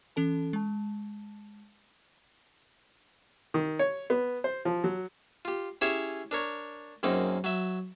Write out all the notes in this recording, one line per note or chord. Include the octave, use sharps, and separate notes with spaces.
E3 C#4 A4 A5
G#3 A5
D#3
C#5
B3
C5
F3
F#3
F4 G4
C#4 E4 G4 G#4 C#5 E5
D4 A#4 C#5
F#2 C#3 A#3 C4 D#4
F#3 E5